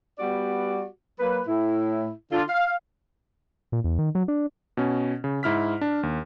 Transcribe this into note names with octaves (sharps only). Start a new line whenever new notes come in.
G3 B3 F#4 G4 D5
F#3 A#3 B4
A2 E4
D3 D4 F4
F5
A#2
E2
D#3
F#3
D4
B2 C#4
C#3
G#2 E4 F6 B6
D4
D#2